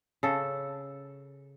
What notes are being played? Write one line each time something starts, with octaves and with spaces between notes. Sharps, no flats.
C#3 A4